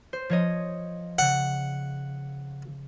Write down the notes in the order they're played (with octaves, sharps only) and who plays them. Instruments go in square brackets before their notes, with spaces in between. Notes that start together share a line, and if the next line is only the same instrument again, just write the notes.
[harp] C5
F3 C#5 D#5
[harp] C#3 [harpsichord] F#5